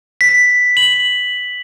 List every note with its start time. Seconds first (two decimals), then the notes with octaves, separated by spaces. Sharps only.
0.21 B6
0.77 F#7